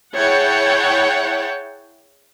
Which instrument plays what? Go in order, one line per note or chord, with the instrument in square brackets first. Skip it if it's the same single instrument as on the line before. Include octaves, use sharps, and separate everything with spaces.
[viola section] E4 G#4 C#5 F#5 G5 A5